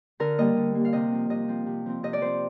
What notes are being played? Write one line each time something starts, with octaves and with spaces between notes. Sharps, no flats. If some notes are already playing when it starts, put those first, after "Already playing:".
D3 A#4
G3 A#3 D#5
D3
A#3
G3 F5
C3 D#5
F3 C4
C3 D#5
F3 C4
C3
F3 C4
C3 D#5
D5
F3 C4 C5